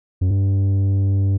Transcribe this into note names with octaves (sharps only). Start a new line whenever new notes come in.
F#2
G2